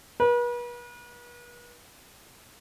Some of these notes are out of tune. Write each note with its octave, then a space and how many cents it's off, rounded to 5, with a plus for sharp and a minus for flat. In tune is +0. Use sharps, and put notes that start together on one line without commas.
B4 -40